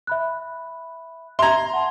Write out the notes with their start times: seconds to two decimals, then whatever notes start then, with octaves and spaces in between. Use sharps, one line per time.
0.07 E5 B5 F#6
1.39 E5 A#5 C6 G#6
1.73 F#5 A5